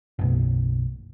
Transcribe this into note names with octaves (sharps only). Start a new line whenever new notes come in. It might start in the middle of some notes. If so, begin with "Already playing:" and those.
F#1 B1